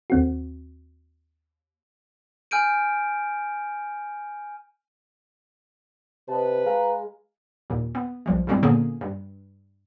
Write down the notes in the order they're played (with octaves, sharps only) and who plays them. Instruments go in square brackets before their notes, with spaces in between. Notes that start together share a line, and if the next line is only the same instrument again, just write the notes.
[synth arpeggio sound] D#2 C4 F#4
[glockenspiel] G#5 F6 G6 D7 D#7
[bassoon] C3 [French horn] B4 [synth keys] D#5 A5
[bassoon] G#3 [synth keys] F5 A#5
[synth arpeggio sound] D#2 A#2
B3
B1 F3 G3
G2 B2 G3 G#3 C4 E4
A#2 D3 A#3 B3 C#4 G#4
G2